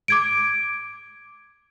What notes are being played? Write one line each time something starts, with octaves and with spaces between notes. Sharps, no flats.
D6 G#6 D7